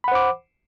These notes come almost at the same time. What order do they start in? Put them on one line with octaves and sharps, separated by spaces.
B5 F#5 C5 D6